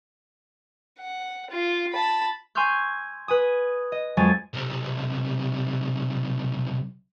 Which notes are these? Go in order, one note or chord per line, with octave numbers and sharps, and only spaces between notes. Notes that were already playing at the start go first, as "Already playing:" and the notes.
F#5
F4
A5 B5
G#5 C6 C#6 E6 F6 G6
B4 G#5 D#6
D#5
F2 F#3 G#3 G#5 A6
B1 C3